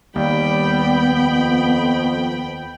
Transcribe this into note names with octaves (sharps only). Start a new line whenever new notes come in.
D#2 G3 B3 G5 B5
F2